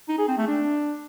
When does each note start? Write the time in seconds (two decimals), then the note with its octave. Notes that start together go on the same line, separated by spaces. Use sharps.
0.09 D#4
0.18 G#4
0.28 C4
0.38 A3
0.47 D4